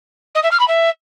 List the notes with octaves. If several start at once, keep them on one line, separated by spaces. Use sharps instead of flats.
D#5
E5
F6
B5
E5